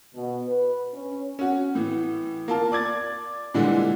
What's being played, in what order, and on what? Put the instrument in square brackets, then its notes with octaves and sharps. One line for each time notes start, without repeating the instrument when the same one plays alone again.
[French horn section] B2
B4
C#4
[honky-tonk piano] C#4 F#4
A2 E3
A#3 F4 A5
D5 D6 G#6 A6
A#2 D3 E3 G3 G#3